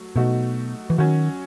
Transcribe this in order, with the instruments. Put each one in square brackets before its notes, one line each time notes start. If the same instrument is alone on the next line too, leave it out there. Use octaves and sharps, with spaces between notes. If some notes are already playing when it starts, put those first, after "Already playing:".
Already playing: [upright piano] F#3 A3
[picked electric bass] B2 [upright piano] F#3 A3 D#4 F#4
[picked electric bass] E3
[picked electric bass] D#3 [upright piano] F#3 C#4 F#4